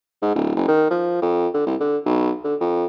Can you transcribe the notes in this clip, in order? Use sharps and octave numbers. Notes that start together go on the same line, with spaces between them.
G#2
D1
F#1
D#3
F3
F2
D3
C2
D3
B1
D3
F2